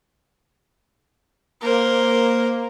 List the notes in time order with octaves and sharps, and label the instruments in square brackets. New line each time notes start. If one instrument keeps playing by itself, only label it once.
[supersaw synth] A#3 [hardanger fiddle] A#4 C5